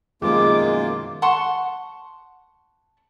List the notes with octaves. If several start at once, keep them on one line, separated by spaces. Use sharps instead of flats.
F#2 B2 D#3 F3 G#3 A#3 F4 D6
F#5 A5 C6 C#6